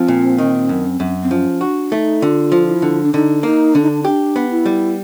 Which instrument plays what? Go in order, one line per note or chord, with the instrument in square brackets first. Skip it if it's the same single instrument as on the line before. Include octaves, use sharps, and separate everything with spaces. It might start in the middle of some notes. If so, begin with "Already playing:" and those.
Already playing: [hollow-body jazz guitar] F3 [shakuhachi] C4
[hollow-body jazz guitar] A#2
D#3
F#2
F#2
[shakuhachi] C4
[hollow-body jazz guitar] F3 [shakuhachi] C#4
[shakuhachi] D4 [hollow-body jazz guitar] F#4
[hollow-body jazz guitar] A3 [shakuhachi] D#4
[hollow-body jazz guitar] D3 [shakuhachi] F4
[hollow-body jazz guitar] F3
[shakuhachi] E4
[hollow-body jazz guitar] D3
[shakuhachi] D4
[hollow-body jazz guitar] D3 [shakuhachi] D#4
[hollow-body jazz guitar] A#3 [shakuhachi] D#4
[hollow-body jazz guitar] D3 [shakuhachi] D4
[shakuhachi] D#4
D4
[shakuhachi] D4 [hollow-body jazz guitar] G4
[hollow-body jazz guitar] B3
[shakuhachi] E4
[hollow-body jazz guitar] G3